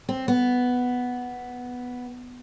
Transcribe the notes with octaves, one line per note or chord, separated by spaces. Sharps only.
C4
B3